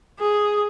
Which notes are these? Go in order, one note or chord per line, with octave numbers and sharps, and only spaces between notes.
G#4